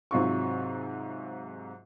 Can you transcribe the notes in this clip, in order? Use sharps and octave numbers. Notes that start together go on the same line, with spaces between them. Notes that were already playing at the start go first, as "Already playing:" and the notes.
G#2 C3 F#3 F4 F#4 C#6